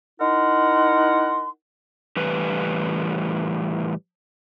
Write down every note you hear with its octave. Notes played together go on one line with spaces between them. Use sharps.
D#4 E4 A#4 F#5 C6
A2 E3 G3 B4